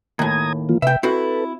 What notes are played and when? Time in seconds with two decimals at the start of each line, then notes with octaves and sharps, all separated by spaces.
0.19 D#2 A2 A#5 D#6 G#6
0.69 E3 A#3 F4
0.82 C3 B4 E5 G5
1.03 C4 E4 F#4 A4 B4